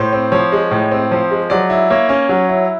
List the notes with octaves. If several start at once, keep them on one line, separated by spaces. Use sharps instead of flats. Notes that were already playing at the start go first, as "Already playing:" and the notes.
Already playing: A2 C5
C4
F3 C#5
G#3
A2
C4
F3
G#3
F#3 D5
E4
A#3 C#5
C#4
F#3
E4